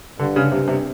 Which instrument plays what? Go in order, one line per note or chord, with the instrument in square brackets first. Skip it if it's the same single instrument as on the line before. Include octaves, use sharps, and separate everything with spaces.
[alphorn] G2 [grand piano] D3
[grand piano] C#3
[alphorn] G2 [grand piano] C3
[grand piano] C3